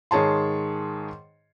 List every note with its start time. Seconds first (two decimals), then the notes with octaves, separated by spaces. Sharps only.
0.11 G#2 D#3 G#4 C#5 A5 C6